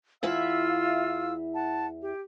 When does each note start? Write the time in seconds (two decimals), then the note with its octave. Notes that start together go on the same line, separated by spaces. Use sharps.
0.23 E2 E4 F4 E5 F5 E6
1.55 F#5 A5
2.01 G4